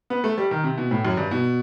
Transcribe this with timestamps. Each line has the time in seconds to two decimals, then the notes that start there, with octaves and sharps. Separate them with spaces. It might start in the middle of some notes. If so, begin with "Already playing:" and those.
0.10 B3
0.24 A3
0.38 G3
0.51 D#3
0.64 C3
0.77 B2
0.91 A2
1.05 F#2
1.17 G2
1.31 B2